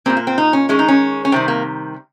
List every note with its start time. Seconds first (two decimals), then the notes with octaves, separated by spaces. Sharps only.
0.06 A#2 G3 A#3 C4
0.17 A#3
0.27 C4
0.38 D#4
0.53 C#4
0.69 D#3 G#3 C#4
0.79 D#4
0.88 C#4
1.25 C#4
1.32 C3 D#3 G3 C4
1.48 A#3